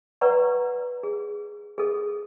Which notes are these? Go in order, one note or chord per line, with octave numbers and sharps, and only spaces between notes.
B4 D5 F#5 A#5 C#6
G#4
G#4 A4